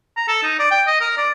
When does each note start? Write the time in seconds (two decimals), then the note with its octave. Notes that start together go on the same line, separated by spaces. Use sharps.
0.17 A#5
0.28 A4
0.43 D#4
0.59 D5
0.71 G5
0.87 D#5
1.00 A#4
1.18 D5